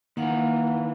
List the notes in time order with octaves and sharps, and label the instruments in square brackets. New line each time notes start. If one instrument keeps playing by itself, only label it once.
[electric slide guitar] D#3 E3 [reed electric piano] A#3 [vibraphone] F5 F#5 A#5